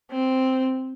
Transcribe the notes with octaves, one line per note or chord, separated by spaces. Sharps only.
C4